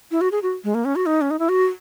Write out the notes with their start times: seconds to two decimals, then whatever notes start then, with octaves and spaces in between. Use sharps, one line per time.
0.11 E4
0.21 F#4
0.32 G#4
0.43 F#4
0.64 G#3
0.74 A#3
0.85 C#4
0.96 F#4
1.06 D#4
1.21 C#4
1.31 D#4
1.39 E4
1.49 F#4